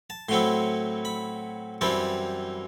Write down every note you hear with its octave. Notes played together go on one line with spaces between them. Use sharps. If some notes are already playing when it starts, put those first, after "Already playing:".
A5
A2 F#3 C4 E4 C6
B5
F#2 E3 G3 C4 E4 A5